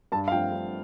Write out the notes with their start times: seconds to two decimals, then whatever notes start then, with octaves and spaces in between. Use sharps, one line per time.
0.12 G2 A5
0.28 F5
0.32 F3 A3 C4 G5
0.52 G2